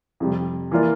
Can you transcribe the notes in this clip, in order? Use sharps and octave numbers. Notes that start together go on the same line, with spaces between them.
F2 C3 G3
E3 A#3 F4 A#4 D5